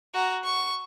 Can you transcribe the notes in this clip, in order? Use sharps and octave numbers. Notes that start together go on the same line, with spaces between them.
F#4 A#5
C#6